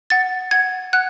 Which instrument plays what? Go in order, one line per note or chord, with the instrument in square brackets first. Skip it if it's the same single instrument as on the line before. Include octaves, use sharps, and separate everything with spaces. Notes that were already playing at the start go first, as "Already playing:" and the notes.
[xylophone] F#5 A6
F#5 G#6
F#5 F#6